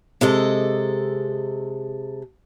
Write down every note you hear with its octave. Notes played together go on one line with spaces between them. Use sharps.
C3 G#3 A4 D#5